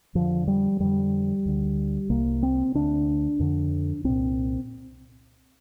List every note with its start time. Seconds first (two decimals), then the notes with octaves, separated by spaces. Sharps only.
0.15 F2 D3 F3
0.48 G3
0.80 F2 D3 G3
1.45 D2 D3
2.10 C2 C3 A#3
2.43 C4
2.75 D2 D3 D4
3.40 F2 D3
4.04 C2 A#2 C4